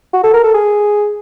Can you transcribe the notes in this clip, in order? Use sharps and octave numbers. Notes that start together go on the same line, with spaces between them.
F#4
A4
A#4
A4
G#4